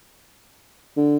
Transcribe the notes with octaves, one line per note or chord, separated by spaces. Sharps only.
D3